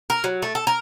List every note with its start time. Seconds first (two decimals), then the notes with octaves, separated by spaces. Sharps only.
0.10 A#4
0.24 F#3
0.42 A3
0.55 A4
0.67 A#4